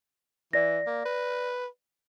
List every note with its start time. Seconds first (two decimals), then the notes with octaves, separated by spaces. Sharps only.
0.53 E3 D5 A#6
0.86 A#3
1.05 B4